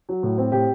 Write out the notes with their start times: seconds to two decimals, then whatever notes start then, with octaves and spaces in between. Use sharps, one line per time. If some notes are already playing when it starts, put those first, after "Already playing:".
0.09 F#3
0.23 A2
0.38 C4
0.52 A2 G4